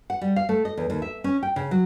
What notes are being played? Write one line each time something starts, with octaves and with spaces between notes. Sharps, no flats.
F#5
G3
F5
A3
D#5
E2
D#2
E5
C#4
G5
C#3
F#3